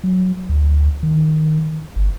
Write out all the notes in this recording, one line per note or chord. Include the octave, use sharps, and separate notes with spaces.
F#3
D2
D#3
G1